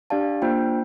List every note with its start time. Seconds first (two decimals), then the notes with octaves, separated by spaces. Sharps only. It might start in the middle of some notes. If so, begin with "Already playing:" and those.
0.10 D4 G4 D5 F5 A5
0.42 A#3 D4 F4 C5 G5